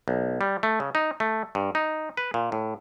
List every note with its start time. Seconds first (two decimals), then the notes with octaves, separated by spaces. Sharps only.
0.08 B1
0.41 G3
0.63 A3
0.80 C#3
0.95 D#4
1.20 A3
1.55 G2
1.75 D#4
2.17 B4
2.34 A#2
2.52 A2